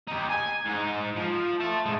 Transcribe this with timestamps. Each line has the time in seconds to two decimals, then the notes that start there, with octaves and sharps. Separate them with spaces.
0.08 D#4 G4
0.30 G#5
0.65 G#2 D#4
1.16 F3
1.60 E5 A5
1.86 G#2 G#3